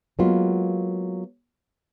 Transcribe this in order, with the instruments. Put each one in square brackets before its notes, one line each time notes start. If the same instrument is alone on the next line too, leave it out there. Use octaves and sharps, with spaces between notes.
[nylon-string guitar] F#3 G#3 A#3 B3 F4